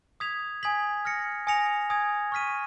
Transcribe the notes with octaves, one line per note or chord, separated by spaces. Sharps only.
D#6 G#6 B6 F7
G#5 D#6 G#6 B6 F#7
F6 A#6 C#7
G#5 D#6 A#6 C#7 F7
G#5 D#6 G#6
C#6 F6 B6 D#7